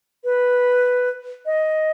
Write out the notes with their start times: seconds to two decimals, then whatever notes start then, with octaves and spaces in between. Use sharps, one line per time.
0.24 B4
1.46 D#5